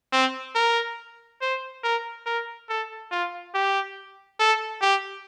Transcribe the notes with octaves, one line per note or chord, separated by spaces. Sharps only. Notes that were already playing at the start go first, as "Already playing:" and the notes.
C4
A#4
C5
A#4
A#4
A4
F4
G4
A4
G4